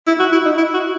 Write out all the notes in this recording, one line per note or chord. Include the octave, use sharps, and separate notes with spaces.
E4
F#4
E4
D#4
E4
F#4